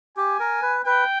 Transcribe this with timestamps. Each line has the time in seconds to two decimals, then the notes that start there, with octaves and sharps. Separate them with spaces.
0.17 G4 G#5
0.40 A#4
0.62 B4
0.85 B4 G5